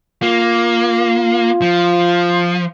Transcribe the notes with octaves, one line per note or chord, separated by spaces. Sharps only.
A#3 F4
F3